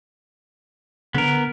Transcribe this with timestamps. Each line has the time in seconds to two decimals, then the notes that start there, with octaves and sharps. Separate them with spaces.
1.15 D3 B3 A#4